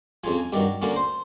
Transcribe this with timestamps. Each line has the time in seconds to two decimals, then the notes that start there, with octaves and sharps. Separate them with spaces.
0.24 F2 C#3 F3 G#5
0.38 G#5
0.53 G2 D#3 F#3 D5
0.82 D3 F#3 A#3 C#4 D5
0.96 C5